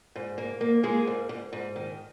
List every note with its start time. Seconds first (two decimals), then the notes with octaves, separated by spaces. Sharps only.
0.16 G#2
0.38 A#3
0.61 A#3
0.83 G#3 A#3 G#4
1.07 G#2
1.29 G#2
1.53 G#2
1.76 D#3